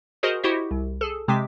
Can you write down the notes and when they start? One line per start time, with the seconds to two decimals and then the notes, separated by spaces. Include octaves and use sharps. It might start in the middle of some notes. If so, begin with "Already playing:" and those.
0.23 F#4 G#4 A#4 C5 D#5
0.44 E4 F#4 G4 C5 D#5
0.71 C2
1.01 G#4 A4
1.28 C3 G#3 C4 D6 B6